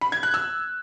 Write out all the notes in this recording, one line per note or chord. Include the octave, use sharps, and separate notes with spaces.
B5
G#6
F#6
E6